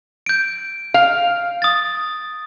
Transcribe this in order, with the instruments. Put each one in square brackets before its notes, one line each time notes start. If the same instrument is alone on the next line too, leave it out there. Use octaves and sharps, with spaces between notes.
[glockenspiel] G6 D7
[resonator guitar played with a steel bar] F5
[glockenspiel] D#6 A6